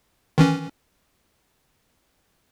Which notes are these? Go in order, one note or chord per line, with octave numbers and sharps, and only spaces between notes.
D#3 E3 C#4